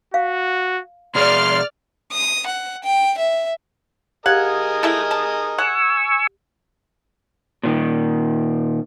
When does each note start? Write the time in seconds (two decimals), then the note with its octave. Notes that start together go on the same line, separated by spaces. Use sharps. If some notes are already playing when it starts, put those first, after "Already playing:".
0.14 F#4 F5
1.15 B2 G#4 D5 C6 F6
2.12 D#6
2.47 F#5
2.84 G5
3.18 E5
4.26 G4 G#4 A#4 D#5 F5 F#5 G#6
4.83 A3 E4 A4
5.11 A5
5.58 F#5 G#5 C#6 E6
7.63 A#2 D#3